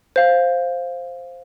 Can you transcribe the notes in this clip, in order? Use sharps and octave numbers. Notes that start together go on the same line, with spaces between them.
C5 F5